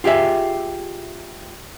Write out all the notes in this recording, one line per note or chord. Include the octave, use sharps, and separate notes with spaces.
F4 G4 G#4 E5